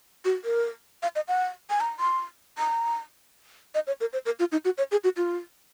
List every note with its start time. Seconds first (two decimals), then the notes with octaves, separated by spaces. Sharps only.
0.25 F#4
0.45 A#4
1.03 F5
1.16 D#5
1.28 F#5
1.70 G#5
1.80 A#5
1.99 C6
2.58 A#5
3.75 D#5
3.87 C#5
4.01 A#4
4.13 C5
4.26 A#4
4.39 F4
4.52 D#4
4.65 F#4
4.78 C#5
4.91 G#4
5.04 F#4
5.17 F4